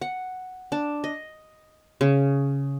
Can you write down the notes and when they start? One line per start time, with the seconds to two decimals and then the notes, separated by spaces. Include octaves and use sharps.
0.01 F#5
0.72 D4
1.04 D#5
2.01 C#3